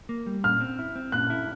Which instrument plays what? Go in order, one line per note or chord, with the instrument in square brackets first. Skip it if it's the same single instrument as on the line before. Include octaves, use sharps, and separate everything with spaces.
[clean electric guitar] A#3
G3
[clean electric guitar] A#2 [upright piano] F6
[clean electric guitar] C4
E4
C4
[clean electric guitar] A#2 [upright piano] F#6
[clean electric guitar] E4